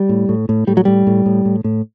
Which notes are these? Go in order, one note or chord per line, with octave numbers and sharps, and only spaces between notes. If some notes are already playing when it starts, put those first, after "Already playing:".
Already playing: G3
A2
A2
A2
A2 G3
F#3
A2 G3
A2
A2
A2
A2